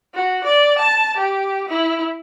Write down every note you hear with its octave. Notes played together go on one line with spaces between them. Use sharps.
F#4
D5
A5
G4
E4